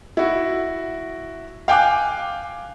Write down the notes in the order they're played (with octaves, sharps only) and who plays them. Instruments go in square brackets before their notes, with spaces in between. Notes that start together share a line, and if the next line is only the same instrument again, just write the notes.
[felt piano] E4 F#4
F5 G5 G#5 D6 F#6